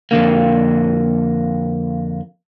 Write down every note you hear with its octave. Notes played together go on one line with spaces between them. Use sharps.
F2 G#2 D3 A#3